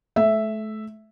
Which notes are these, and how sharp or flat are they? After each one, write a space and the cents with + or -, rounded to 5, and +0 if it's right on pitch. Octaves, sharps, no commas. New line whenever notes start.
A3 -30 E5 +0